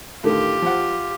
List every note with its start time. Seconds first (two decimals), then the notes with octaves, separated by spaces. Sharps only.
0.24 A2 D3 D#3 F4 G4
0.62 F3 F#5